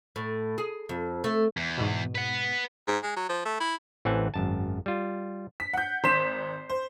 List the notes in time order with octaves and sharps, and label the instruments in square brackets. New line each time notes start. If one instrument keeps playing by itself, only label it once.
[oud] A2
G#4
F2
A3
[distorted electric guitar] E2
[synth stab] G#2 B2
[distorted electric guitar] B4 F#5
[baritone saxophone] G#2
G#3
F#3
F3
A3
E4
[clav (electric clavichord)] A1 E3 C4 F#5 G#5 A5
G#1 F#2 A5
G3 F4
[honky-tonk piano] B6
F#5 G6
[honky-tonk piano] G#1 B6 E7 [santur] C5
[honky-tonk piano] C5